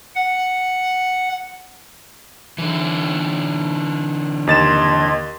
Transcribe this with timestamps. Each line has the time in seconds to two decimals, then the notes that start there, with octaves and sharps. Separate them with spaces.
0.15 F#5
2.58 D3 E3
4.47 D#2 D#5 C6 G#6 A6 E7